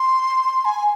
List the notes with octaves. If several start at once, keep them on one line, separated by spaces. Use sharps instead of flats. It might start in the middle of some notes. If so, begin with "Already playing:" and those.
Already playing: C6
G#5